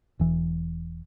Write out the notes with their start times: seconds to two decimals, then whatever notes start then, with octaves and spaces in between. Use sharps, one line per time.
0.19 E1 E3